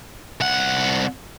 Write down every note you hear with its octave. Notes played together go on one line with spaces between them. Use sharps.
C2 F#5